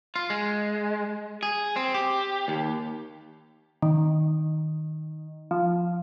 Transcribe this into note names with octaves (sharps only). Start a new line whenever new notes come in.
F4
G#3
G#4
C4
G4
D#2
D#3
F3